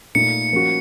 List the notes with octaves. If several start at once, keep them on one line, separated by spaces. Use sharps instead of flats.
A#2 A3 D#4 C#7
F3 A#3 C#4 F#4